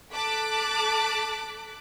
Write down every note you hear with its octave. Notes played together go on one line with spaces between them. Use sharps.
A4 A5 D6 F#6 B6 D7